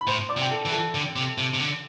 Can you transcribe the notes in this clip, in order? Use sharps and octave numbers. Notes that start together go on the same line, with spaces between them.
B5
A2 C5 C6
D5 D6
C3
G5
A4 A5
E3
A4 A5
D3
C3
C3
C3
D3